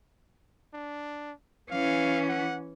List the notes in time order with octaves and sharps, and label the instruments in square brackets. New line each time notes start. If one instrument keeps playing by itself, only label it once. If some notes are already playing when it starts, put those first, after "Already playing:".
[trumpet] D4
[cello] E3 C#4 [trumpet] F5
[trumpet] F#5